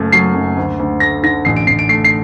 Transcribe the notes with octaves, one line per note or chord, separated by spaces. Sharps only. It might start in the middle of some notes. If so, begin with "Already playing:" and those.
Already playing: F#1 F#2 A3
F#3 C7
F#2
D2
D2
A3 A#6
D3 A#6
A1 C7
D7
A1 C7
D7
A3 C7
C7